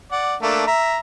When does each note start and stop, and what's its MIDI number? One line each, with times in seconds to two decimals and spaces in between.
0.12 0.35 74
0.12 0.35 78
0.42 0.65 57
0.42 0.65 58
0.42 0.65 62
0.67 0.98 76
0.67 0.98 82